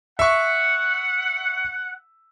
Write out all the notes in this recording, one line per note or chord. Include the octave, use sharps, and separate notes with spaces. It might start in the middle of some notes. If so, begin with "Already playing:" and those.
E5 F#5 C#6